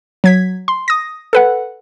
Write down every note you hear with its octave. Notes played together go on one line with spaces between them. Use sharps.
F#3 G#6 B6
C6
D#6 A#6
A4 B4 F#5